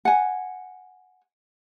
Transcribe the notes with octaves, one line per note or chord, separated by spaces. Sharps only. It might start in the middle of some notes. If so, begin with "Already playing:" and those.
F#5 G#5